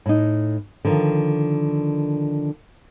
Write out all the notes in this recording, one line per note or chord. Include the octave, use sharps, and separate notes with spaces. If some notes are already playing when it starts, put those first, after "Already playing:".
A2 D#4
D3 D#3 F3